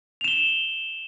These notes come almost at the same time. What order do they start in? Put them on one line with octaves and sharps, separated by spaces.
F7 E7 G7